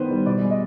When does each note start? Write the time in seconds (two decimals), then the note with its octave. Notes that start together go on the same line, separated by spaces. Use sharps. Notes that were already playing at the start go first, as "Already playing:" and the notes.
Already playing: D#3 B3 B4 C5
0.10 G3
0.26 B2 D5
0.42 G#3
0.50 D#5